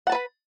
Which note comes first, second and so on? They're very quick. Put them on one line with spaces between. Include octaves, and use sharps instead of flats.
F#5 A5 B4 B5